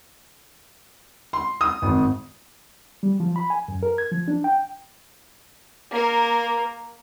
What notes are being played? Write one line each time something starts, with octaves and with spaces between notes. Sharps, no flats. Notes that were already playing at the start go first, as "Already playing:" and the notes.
C6
D#6
G#1
G3
F3
B5
G#5
F#2
A#4
G#6
F3
D4
G5
A#3 A#4